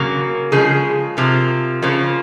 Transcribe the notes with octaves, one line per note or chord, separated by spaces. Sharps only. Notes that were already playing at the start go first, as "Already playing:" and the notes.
Already playing: C#3 F#3 A#3
C#3 F3 G#3 G#4
C3 F3 A#3
C#3 F3 A#3